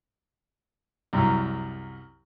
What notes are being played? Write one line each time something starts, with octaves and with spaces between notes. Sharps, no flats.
C2 F#2